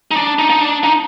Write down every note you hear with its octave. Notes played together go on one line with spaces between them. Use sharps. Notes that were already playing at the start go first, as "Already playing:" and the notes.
D#4
D4
D#4
D#4
D4
D#4